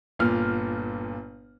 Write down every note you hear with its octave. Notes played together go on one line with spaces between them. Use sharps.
G1 A#2 F6